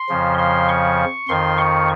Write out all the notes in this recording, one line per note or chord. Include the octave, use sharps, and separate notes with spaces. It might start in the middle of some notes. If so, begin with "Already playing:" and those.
Already playing: C6
F2 C#3 F3
C6
C#6
F2 D#3 C6
C#6